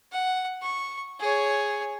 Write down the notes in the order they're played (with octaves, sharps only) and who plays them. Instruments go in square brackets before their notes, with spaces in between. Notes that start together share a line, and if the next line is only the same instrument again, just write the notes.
[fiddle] F#5
C#6
G#4 C#5